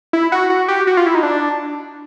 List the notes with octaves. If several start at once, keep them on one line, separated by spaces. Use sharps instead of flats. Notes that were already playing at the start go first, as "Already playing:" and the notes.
E4
F#4
F#4
G4
F#4
F4
E4
D#4
D4